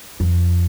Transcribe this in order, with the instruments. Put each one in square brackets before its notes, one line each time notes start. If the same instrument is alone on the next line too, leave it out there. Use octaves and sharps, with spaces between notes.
[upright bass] F2